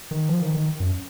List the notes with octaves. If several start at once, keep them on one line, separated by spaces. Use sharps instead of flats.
D#3
F3
D#3
D#3
F#2